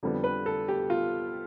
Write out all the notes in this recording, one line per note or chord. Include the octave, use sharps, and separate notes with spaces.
F2 D3 G3 B3
B4
A4
G4
F4